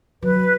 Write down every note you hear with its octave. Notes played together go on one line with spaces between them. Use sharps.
F#3 B4